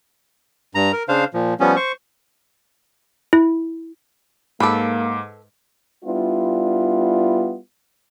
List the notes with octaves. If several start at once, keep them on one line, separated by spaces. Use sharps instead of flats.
G2 A#5
A#4
C#3 D4 C5 F5
A#2 F3
F3 G3 B3 C#4
C5 C#6
E4
G#2 A#3 A4 B4 D6
G3 B3 D4 E4 F4